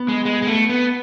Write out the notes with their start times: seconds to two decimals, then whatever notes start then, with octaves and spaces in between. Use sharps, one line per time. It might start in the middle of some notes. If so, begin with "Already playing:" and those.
Already playing: B3
0.08 G#3
0.25 G#3
0.42 G#3
0.47 A3
0.69 B3